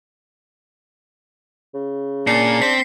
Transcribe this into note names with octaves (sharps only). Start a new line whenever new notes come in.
C#3
A#2 D4 C7 C#7
C4 C5 B6